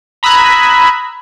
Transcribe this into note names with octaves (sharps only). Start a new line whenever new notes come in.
A#5 B5 D#6 E6 F#6 G#6